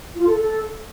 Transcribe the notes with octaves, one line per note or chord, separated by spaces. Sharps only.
F4
A4
A4